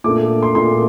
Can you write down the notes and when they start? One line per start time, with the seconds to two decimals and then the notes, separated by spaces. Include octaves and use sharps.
0.04 A#2 A3 D4 D6
0.43 C6
0.55 A#2 A3 D4 C6